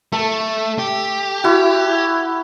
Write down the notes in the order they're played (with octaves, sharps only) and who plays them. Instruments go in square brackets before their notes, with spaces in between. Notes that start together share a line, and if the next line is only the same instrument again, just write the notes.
[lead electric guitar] A3 [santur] A4
[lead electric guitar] G4
[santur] E4 F#4